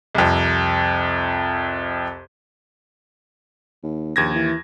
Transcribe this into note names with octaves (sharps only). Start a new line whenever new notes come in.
C2 F2
D#2
A#1 D#2 G#6 A#6
E3